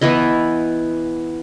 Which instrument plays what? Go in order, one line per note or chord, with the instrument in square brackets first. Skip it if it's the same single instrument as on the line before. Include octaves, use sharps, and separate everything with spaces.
[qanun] E3 B3 E4 D#5